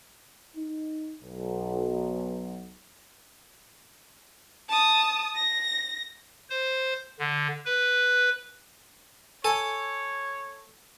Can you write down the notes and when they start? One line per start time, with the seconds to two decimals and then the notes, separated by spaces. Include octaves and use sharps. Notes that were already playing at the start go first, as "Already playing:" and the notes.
0.57 D#4
1.22 B1
4.69 A5 D#6
5.35 A#6
6.50 C5
7.19 D3
7.65 B4
9.44 A4 C#5 G#5